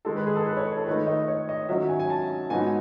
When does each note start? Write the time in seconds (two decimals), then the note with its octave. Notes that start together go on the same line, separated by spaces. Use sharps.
0.05 D#3 G#3 D#4 A4
0.16 B4
0.26 G#4
0.36 A4
0.46 B4
0.57 C#5
0.67 C#5
0.77 A4
0.86 D#3 A3 D#4 B4
1.07 D#5
1.28 C#5
1.49 D#5
1.69 D#3 F#3 C#4 E5
1.89 G#5
2.00 G#5
2.10 A5
2.50 G#2 F#3 B3 D#4 G#5